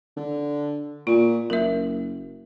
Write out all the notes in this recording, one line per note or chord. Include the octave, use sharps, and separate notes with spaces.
D3
A#2 F4
F#1 A#4 E5